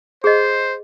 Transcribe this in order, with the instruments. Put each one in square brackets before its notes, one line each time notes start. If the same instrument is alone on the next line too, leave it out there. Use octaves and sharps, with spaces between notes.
[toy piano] G#4 D#5 [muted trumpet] C5